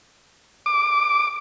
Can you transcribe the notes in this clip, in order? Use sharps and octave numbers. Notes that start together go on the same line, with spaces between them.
D6